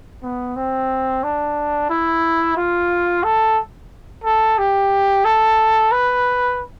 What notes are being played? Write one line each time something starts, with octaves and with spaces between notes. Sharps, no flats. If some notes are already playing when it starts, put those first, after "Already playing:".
B3
C4
D4
E4
F4
A4
A4
G4
A4
B4